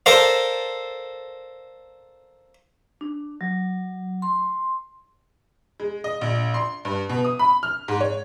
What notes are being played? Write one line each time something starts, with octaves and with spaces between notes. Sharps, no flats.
A4 A#4 C5 D5 F5
D4
F#3
C6
G#3
D#5
A#1
C6
G2
B2
D#6
B5
F6
G#2
C#5